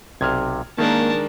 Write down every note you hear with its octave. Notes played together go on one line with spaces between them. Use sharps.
B1 C3 A5 F6 G#6
D#3 G#3 A#3 C#4 D4 A#4 A5